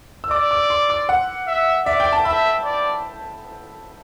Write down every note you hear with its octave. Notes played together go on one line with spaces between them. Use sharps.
E6
D5 D6
D6
C6
D6
F#5
E5
D5 E5
G5
A5
E5 B5
D5